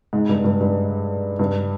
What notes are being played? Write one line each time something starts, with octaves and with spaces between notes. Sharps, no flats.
G#2
G2
G2
G2
G2